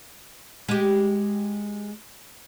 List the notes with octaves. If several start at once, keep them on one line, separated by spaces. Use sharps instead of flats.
G#3 G4